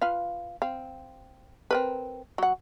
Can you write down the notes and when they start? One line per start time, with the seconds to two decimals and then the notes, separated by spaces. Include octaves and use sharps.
0.02 F4 B4 F5
0.62 C4 F5
1.71 C4 A#4 B4
2.38 F#3 F#5